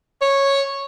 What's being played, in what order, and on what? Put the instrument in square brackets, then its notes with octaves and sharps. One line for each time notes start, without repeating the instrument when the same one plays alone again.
[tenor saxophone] C#5